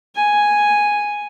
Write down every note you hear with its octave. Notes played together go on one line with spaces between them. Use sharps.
G#5